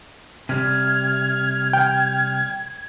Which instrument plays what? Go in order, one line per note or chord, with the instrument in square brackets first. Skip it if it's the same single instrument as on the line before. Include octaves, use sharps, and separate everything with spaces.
[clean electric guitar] C3 G3 [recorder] F6 [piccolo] G#6
[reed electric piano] G5